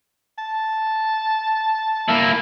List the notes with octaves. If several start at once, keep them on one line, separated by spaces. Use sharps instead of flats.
A5
A#3 E4